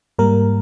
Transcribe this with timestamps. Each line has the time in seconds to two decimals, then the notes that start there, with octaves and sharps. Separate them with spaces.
0.19 G#2 G3 A#3 A#4